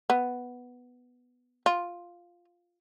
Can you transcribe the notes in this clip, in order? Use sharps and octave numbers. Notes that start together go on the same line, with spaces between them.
B3
F4